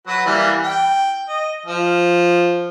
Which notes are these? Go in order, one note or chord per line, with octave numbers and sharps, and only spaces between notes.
F#3 F#4 B4
E3 G3 A#3
G5
D#5
F3